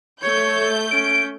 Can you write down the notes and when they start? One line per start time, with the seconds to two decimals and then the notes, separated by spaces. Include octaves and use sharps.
0.22 A3 C#5 G6
0.91 C#4 D7